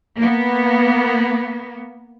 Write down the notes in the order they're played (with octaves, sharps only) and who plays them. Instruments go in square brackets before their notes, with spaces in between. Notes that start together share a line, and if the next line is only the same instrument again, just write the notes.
[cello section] A#3 B3